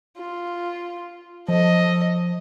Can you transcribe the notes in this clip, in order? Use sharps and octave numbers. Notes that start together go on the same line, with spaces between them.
F4
F3 A4 D#5